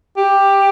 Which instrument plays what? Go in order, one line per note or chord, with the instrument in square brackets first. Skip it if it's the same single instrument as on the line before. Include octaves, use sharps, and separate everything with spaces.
[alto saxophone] G4